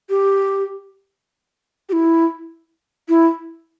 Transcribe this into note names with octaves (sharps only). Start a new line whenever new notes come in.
G4
G4
E4
E4